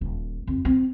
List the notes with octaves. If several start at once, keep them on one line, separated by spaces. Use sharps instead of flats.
D#1
F2
C4